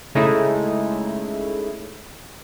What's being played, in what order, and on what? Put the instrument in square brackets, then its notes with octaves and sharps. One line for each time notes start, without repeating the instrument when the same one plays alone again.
[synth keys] C#3 G#3 A3 D#4 E4